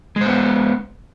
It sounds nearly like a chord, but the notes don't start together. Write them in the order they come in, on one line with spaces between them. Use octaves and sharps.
G#3 C5 B3